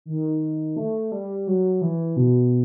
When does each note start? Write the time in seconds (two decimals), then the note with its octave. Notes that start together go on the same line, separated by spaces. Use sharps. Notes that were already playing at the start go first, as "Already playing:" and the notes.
0.05 D#3
0.77 A3
1.12 G3
1.47 F#3
1.82 E3
2.16 B2